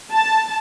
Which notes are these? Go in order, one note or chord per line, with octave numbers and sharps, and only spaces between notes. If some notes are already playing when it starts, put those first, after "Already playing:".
A5